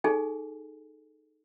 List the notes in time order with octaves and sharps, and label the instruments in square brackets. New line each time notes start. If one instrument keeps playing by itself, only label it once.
[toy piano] D#4 G#4 A4 G#5